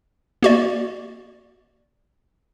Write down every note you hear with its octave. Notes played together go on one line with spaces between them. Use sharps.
A#3 F#4 D5